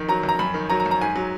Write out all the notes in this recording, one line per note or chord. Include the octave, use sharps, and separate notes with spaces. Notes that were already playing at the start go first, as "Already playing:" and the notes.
Already playing: F2 D#3
F#3 A#5
F2
A#5
F#2 B5
D#3
F#3 A#5
A#5
F#2
A#5
G#2 G#5
F#3